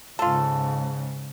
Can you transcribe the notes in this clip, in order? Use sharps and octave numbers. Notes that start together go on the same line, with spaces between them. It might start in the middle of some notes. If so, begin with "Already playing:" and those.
G#2 C#3 F4 A4